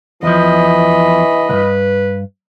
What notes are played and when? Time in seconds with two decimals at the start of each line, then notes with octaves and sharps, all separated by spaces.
0.23 E2 E3 F3 D#5 B5
1.49 C2 G2 B4